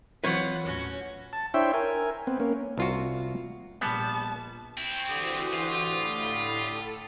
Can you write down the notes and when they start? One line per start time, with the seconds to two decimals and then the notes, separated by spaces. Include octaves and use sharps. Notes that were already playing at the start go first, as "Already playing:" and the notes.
0.24 E3 F#3 C4 F4 B4 C#5 F#5
0.65 D#2 A2 C#4 F#4
1.33 A5
1.54 D4 E4 C5 C#5 E5 G5
1.74 A#4 G#5
2.27 B3 C4
2.40 A#3 C#4
2.78 C2 F4 F#4
3.81 A#1 A#2 G3 B3 A5
4.78 C4 E4 G5 C#6 G#6
5.09 D3 E3 F#4 G4 C5 D#6
5.54 F4
5.85 A2 B5
6.66 A4